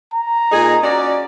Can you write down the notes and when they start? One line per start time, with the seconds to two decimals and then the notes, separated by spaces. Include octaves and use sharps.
0.14 A#5
0.52 A#2 D#4 G#4
0.83 C#4 F#4 D5